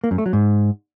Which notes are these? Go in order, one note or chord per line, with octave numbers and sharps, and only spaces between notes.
A#3
F#2
A3
F#3
G#2